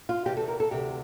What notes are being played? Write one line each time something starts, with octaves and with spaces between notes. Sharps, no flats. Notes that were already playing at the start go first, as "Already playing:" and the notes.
F4
E2 C3 E3 G4
A4
A#4
A4
D2 C3 E3 G4